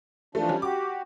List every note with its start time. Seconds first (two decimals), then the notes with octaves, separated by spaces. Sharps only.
0.35 E3 F3 A3 D4
0.48 G3 C#4
0.62 F#4 G4 D6